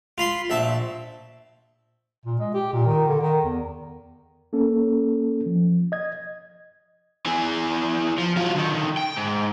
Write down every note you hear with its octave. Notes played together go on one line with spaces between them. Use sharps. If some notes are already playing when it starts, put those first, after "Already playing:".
F4 B5 C6
A#1 E5 A5
A#2
G#3
G4
A#2
D#3
D3
D#3
E2
A#3 C#4 A4
F3
D#5 G#6
E3 G#4
F3
F#3 F4
D3 D#3
G5
G#2